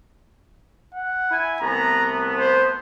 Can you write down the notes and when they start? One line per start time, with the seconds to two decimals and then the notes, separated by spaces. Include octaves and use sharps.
0.94 F#5
1.30 E4 G#5
1.61 C2 A3 B3 A#5
2.38 C5